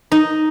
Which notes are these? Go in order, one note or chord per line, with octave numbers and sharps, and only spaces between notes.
D#4